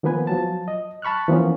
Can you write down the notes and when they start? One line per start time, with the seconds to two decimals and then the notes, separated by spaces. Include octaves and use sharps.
0.03 D#3 F3 A#3 B3 B4 G#5
0.27 F3 F#3 A5
0.68 D#5
1.02 A5 B5 C#6 F6 F#6
1.28 E3 F3 A#3 B3 C#4